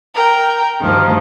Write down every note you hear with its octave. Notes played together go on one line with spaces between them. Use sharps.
A#4 G5
D2 G2 D#3 F3